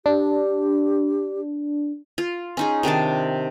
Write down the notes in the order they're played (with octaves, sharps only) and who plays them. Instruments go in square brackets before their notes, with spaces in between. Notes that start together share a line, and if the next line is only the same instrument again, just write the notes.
[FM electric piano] D4 [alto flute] G4
[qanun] F4
C#4 D#4 G#4
C3 D#3 D4 A5